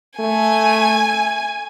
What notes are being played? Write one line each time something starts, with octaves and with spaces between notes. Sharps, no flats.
A3 G#5